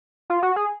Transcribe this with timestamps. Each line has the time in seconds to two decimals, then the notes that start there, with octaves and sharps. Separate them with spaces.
0.30 F4
0.43 F#4
0.56 G#4